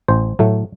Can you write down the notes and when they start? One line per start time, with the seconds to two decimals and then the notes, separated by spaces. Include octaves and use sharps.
0.08 A1 C5
0.39 A2 F#3 A3